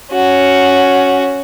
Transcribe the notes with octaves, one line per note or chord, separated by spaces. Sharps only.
C#4 F#4